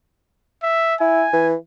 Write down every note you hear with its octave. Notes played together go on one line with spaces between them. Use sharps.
E5
E4 G#5
E3